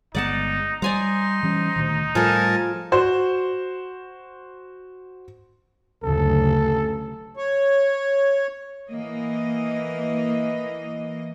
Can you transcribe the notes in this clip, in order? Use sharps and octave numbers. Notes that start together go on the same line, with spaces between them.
G1 G#3 B3 D#4 D5 F#5 A5
G3 D#4 C5 D5 G#5 A#5
E3 G3 C#4
D2 A#2 D#3
A2 F3 G3 G#3 A4 A#4 G#5 A5
F#4 C5
F#1 D2 C#3 A4
C#5
E3 A#3 D#5